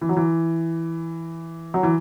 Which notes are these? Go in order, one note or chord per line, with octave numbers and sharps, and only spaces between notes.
E3
F#3
E3
F#3
E3